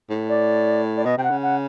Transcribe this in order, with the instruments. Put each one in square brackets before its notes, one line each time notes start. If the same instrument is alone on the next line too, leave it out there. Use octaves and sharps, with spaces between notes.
[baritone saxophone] A2
[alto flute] D5
D5
[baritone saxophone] B2 [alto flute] D#5
[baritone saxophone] C3 [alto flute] G5
[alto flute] F#5
[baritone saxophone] C#3
[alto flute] F#5